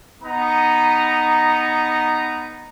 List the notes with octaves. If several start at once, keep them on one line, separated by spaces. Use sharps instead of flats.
B3 D#4 A#5